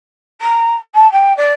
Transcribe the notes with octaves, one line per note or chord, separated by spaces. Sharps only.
A#5
A5
G5
D5